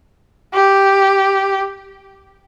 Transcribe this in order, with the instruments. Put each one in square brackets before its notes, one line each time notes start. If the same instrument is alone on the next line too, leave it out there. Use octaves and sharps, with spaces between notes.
[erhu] G4